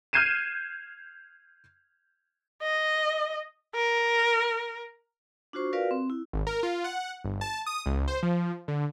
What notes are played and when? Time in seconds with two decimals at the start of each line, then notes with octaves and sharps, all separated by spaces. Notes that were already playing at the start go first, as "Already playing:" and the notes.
0.13 F6 G6 G#6 C7 D#7 E7
2.63 D#5
3.75 A#4
5.53 D4 F4 F#4 C5 C#6
5.73 F4 F#4 A#4 B4 D5 F5
5.91 C4
6.10 E4
6.33 G#1
6.47 A#4
6.63 F4
6.84 F#5
7.24 G1
7.41 A5
7.66 D#6
7.86 C#2
8.08 C5
8.23 F3
8.68 D3